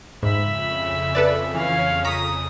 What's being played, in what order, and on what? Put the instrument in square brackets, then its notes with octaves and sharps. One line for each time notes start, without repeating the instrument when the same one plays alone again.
[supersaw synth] F2 C#3 [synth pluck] G#2 [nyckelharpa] E5 B5
[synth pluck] A4 B4 D5
[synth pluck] E3 [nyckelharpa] C#4 F5
[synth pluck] A#5 C#6 B6 [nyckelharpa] D#6